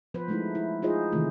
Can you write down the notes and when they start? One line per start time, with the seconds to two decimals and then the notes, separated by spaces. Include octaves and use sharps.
0.14 F3 B3 B4 C5
0.28 G#3 A3 D#4 E4
0.55 E4
0.82 D#4 F4 G#4 C5 D#5
1.12 C3 D#3 E3 G#3 A3